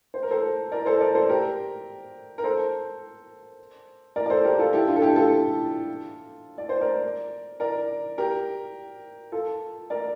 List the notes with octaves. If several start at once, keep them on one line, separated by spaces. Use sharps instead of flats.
C5
A#4
A4 C5
A#4 D5
A4 C5
A#4 D5
A4 C5
G4 A#4
A#4
A4 C5
A#4 D5
D5
A4 C5
G4 A#4
F4 A4
E4 G4
D4 F4
A4
E4 G4
F4 A4
D5
C5
A#4 D5
A#4 D5
G4 A#4
F4 A4
A#4 D5